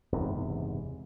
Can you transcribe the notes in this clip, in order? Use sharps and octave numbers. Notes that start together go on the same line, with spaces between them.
F#1 E2 G#2 C3